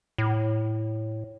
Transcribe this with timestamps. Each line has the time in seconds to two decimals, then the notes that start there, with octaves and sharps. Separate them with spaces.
0.18 A2